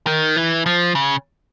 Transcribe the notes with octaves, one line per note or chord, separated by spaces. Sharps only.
D#3
E3
F3
C#3